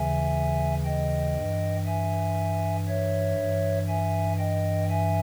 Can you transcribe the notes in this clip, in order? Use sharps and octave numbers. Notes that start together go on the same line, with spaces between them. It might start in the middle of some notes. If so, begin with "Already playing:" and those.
Already playing: D#2 C#3 E3 E5 G#5
D#5 G5
G2 E3
E5 G#5
C#5 E5
G2 E3
E5 G#5
D#5 G5
E5 G#5